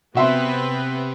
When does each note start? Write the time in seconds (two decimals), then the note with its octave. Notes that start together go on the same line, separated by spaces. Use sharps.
0.15 C3 B3 C4 F#4 B4 E5 C6